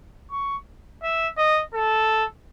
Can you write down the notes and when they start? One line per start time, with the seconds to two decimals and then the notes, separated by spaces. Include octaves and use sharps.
0.31 C#6
1.03 E5
1.38 D#5
1.74 A4